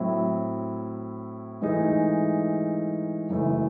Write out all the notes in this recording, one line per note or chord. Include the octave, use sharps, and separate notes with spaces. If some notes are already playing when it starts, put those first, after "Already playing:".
Already playing: A2 F#3 C4 E4
G#2 E3 A3 D#4 G#4
F#1 F#2 E3 A3